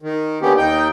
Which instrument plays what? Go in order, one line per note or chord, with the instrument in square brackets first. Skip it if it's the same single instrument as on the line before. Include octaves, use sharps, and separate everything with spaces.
[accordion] D#3
D3 A#3 B3 C#4 G4
D#2 D#4 G5